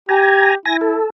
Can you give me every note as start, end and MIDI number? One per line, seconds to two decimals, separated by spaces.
0.09 0.54 67
0.09 0.55 80
0.09 0.55 82
0.65 0.97 64
0.65 0.77 80
0.65 0.77 94
0.81 1.10 69